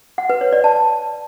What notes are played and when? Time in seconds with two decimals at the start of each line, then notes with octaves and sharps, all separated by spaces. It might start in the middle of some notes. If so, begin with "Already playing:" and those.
0.18 F#5
0.30 B4
0.41 C#5
0.53 D5
0.64 A5